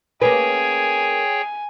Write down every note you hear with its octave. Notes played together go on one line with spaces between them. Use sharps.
A#3 C#4 G#4 B4 C#5 G5 G#5